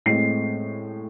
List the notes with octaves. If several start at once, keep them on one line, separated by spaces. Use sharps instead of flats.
A2 G#3 C4 C7